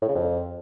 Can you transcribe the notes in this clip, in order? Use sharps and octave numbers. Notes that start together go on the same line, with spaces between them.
A2
C#3
F2